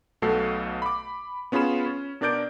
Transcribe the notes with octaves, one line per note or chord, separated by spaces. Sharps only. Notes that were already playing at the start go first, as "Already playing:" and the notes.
B1 B2 A3 F#4 A4 C7
B5 D6
B3 C#4 F4 G#4 B5 E7
C#4
B2 D4 A#4 D5 G6 D7